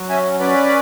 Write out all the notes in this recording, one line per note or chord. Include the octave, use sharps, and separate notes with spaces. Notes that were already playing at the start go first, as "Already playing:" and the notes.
Already playing: F#3
C#4 E5 G#5
C#4 B4 D5